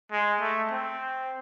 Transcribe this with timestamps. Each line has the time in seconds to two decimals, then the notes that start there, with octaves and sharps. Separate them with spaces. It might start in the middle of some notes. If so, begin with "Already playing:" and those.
0.12 G#3
0.41 A3
0.72 C4